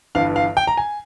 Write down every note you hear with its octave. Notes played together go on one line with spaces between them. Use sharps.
G1 G2 E3 F5
F5
G5
A#5
G#5